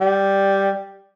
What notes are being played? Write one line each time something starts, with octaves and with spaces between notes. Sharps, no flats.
G3